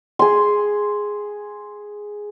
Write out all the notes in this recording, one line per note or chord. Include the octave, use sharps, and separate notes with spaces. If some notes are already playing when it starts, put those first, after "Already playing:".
G#4 C6